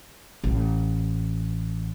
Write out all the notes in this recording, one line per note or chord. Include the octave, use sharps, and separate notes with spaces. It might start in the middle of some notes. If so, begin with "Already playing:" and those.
A1